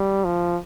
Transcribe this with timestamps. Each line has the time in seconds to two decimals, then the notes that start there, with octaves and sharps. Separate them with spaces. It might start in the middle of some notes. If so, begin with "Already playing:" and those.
Already playing: G3
0.25 F3